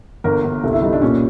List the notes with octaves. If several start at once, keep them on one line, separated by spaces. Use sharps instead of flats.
G1 A#4
G1
C2 A4
E4
G3 D#4
D4
A#2 C#4